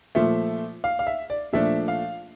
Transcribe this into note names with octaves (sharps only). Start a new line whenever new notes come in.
A#2 F3 A3 E5
F5
F5
E5
D5
A#2 F3 A3 D4 E5
F5